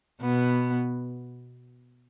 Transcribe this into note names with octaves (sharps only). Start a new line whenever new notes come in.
B2 B3